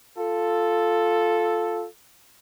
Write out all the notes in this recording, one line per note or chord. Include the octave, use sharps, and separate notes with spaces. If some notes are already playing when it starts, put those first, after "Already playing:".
F4 A4